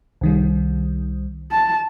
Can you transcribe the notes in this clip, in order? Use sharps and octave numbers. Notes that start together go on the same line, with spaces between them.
C2 D#3 G3
A5